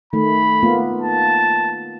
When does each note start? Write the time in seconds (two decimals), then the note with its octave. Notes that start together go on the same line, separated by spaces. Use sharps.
0.13 D#3 A3 B5
0.63 A#3 B3 F4
1.01 A5